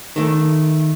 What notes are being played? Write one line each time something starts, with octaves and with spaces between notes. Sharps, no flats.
D#3 A3